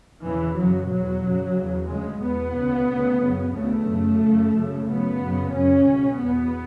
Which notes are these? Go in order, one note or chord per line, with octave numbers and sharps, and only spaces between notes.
E2 C#3 E3
F#2 C#3 F#3
E2 B2 F#3
F#2 C#3
E2 C#3
D2 C#3 G#3
E2 B2 B3
D2 C#3
D2 C#3
F#2 C#3
D2 C#3 A3
F#2 C#3
C#3
F#2
F#2
C#3
F#2 C#3 B3
F#2 C#3
F#2 C#3 C#4
C#2 B2
E2 B2 B3